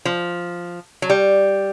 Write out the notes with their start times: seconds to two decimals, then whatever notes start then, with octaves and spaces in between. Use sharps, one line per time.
0.05 F3
1.02 F#3
1.10 G3